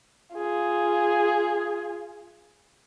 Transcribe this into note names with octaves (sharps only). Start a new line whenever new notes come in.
F4 G#4